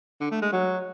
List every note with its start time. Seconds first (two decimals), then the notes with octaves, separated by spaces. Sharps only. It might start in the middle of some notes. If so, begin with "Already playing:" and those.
0.21 D3
0.31 A3
0.42 G#3
0.52 F#3